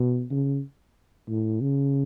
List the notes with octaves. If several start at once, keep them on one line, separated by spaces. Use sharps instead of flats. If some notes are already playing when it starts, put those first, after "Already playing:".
Already playing: B2
C#3
A2
C#3